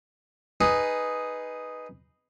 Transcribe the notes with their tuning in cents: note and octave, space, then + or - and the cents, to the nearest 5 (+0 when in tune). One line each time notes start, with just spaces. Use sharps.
D#4 +0 G#4 +0 B4 +0